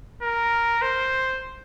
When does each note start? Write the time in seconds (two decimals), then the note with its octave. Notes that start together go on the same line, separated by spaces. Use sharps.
0.23 A#4
0.82 C5